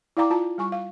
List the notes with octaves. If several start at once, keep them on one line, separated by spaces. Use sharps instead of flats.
E4 D5 F5 G5 A#5 D6
F4 A5 A#5
G3 G#5 C#6
F5